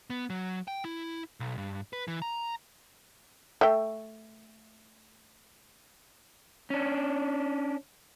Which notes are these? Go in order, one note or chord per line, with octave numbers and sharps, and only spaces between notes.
B3
F#3
G5
E4
B1
G2
B4
E3
A#5
A3 E5 G5
C#4 D4